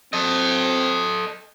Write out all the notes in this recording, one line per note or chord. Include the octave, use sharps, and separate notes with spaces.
C4 A4 D#5